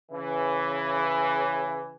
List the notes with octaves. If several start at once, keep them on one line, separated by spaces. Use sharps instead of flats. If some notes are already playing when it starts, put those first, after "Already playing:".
C#3 E3